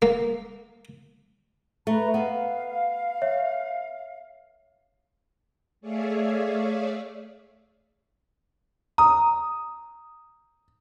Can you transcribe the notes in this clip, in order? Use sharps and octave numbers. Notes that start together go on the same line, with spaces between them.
A#3
A3 B4 A#5
B3 F5
C#5 E5
A3 G#4 C#5 D5 E5 F5
A#5 D#6